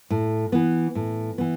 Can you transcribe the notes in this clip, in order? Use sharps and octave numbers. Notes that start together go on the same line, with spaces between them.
A2
E3 B3
A2
E3 B3